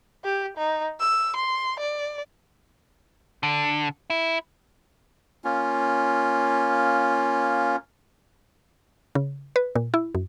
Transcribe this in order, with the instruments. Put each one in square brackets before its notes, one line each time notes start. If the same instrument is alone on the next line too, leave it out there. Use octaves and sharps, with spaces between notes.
[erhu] G4
D#4
E6
C6
D5
[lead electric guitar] D3
E4
[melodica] A#3 C#4 F4
[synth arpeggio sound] C#3
B4
A#2
E4
F#2